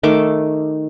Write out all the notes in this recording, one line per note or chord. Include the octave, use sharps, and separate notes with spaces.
D#3 A3 D6